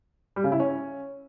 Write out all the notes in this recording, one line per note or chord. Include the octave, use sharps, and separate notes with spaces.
G3
C#3
E4
C#4